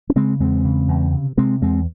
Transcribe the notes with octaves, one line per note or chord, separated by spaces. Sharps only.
C#4
C#3 G#3 C4
E2 G#3 C4
C#3
E2
C3
C3 G#3 C4
E2 G#3 C4